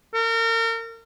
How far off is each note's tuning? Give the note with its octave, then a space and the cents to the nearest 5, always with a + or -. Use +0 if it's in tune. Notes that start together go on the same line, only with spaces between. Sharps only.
A#4 -35